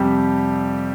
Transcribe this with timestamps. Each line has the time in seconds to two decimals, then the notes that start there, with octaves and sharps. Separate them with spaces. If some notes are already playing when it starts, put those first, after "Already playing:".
Already playing: F2 C3 G3 G4